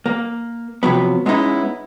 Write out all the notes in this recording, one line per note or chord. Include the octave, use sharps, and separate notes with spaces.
A#3
C3 F3 F#3 B3
G#3 B3 C#4 D#4 E4